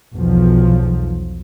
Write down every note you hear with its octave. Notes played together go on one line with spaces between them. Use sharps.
B1 E2 F3